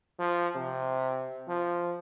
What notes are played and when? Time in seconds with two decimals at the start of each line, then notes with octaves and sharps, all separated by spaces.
0.19 F3
0.56 C3
1.48 F3